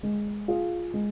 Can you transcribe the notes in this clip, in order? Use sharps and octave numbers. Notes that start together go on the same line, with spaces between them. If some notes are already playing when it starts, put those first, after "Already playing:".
G#3
F4 G#4
G#3